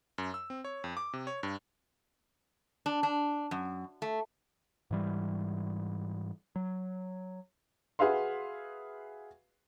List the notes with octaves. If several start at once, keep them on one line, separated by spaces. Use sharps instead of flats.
F#2
E6
C4
C#5
F2
D6
C3
C#5
G2
D4
D4
F#2
A3
G#2 E3 G3
F#3
F#4 G#4 B4 E5 F5 C6